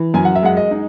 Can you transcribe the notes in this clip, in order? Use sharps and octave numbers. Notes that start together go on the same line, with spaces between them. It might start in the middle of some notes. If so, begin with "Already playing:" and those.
Already playing: E3
F#2 G#5
F#5
E5
G#3 F#5
D#5
D#4